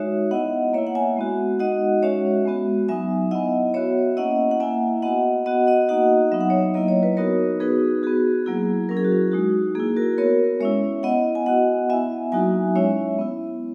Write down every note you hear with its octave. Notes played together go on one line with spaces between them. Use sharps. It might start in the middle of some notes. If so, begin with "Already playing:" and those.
Already playing: G#3 D#4 F#4 C#5 E5
B3 E4 D#5 F#5
A#3 E4 C#5 E5
F#5
E5 G#5
G#3 B3 F#4
G#3 D#4 F#4 D#5 F#5
G#3 C#4 F#4 C#5 E5
G#3 B3 F#4
F#3 B3 D#4 E5 G#5
B3 E4 D#5 F#5
B3 F#4 C#5 E5
A#3 C#4 E4 D#5 F#5
F#5
A#3 E4 E5 G#5
B3 F#4 D#5 F#5
B3 F#4 D#5 F#5
D#5 F#5
A#3 D#4 F#4 D#5 F#5
F#3 B3 D#4 E5
F#5
C#5 E5
F#3 A#3 E4 D#5
C#5
B4
B3 D#4 F#4 A#4 C#5
B3 D#4 F#4 G#4 B4
B3 F#4 G#4
F#3 A#3 E4 G#4
F#3 C#4 E4 A#4
G#4
F#4
G#4
G#3 D#4 F#4
A#3 E4 G#4
F#4 A#4
B3 F#4 A#4 C#5
G#3 C#4 E4 C#5 E5
B3 E4 D#5 F#5
G#5
B3 F#4 D#5 F#5
B3 E4 E5 G#5
F#3 A#3 D#4 F#4 E5 G#5
G#3 C#4 E4 C#5 E5
B3 E4